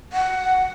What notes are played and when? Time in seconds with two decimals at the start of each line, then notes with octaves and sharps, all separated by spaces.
0.13 F#5